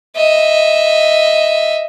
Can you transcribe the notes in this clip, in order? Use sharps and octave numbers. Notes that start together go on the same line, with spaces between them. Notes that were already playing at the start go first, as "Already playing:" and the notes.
D#5 E5